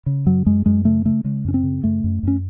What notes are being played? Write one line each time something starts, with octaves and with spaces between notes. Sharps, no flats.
C#3
F#2 F#3
F#2 G#3
F#2 G#3
C#3 A3
C#3 A3
C#3 G#3
F#2 C#4
C4
C#3
F#2 A3
F#2
F#2 C#4